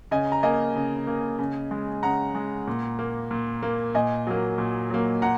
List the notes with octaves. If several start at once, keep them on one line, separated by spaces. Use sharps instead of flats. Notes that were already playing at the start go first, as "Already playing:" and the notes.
C#3 D#5 G#5
A#5
A#3 D#5 G#5
C#3
A#3
C#3
G#3
C#3 F#5 A#5
G#3
A#2
A#3
A#2
A#3
A#2 D#5 G#5
F#3 A#3
A#2
F#3 A#3
A#2 F#5 A#5